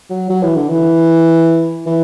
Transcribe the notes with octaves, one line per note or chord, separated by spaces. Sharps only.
F#3
F#3
E3
D3
E3
E3